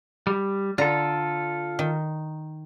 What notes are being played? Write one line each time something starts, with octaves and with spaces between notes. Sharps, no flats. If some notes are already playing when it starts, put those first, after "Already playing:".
G3
D3 F4 A4 A#5
D#3